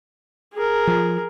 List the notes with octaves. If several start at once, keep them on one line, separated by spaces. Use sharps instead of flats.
G#4 A#4
F3